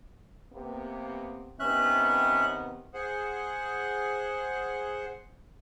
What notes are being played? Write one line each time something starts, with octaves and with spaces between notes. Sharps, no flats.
C3 A#3 B3
C3 D#3 B3 C#4 E5 F#6
G#4 C5 F#5